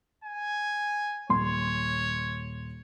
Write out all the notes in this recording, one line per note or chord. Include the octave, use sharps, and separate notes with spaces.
G#5
D#1 C#5 C6